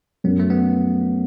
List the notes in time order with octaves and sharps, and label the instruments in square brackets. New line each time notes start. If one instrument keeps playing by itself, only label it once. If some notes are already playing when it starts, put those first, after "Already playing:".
[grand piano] F#2 [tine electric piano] B3
[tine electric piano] A3
B3